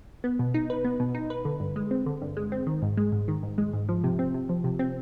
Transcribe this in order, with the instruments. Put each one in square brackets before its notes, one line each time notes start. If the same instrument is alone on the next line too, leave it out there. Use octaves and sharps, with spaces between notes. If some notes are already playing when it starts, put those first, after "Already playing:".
[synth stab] B3
B2
D#4
B4
B3
B2
D#4
B4
D3
G2
G#3
C4
D3
G2
G#3
C4
D#3
G#2
G#3
G#2
D#3
G#2
G#3
G#2
F3
C3
C4
C3
F3
C3
C4